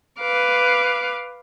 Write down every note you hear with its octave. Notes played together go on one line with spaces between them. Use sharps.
B4 F5 D6